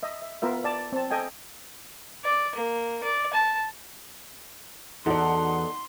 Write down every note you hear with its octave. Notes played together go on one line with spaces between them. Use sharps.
D#5 E5
E5
B3 F4 A#4 E5
D5 A5
C4 A5
A4 D#5 G5 G#5
D5
A#3
D5
A5
E2 D#4 F#4 A4 D5 F#5 C6